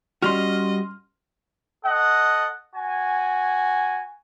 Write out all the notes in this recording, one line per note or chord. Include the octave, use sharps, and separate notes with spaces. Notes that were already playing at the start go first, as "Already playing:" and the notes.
G3 C#4 F#4 D#5 C6 F6
A4 D#5 F#5
F#4 G#5